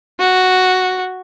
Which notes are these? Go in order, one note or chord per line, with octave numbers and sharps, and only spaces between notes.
F#4